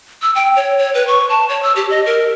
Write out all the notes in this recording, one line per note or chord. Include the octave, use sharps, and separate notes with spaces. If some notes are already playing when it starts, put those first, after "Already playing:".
E6
G5
C#5
C#5
B4
C#6
A5
C#5
E6
G4
D#5
A#4